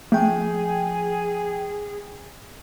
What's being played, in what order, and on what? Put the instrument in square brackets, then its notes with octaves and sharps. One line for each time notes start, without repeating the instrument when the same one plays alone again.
[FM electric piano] F3 G5 [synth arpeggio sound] A3 [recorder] G#4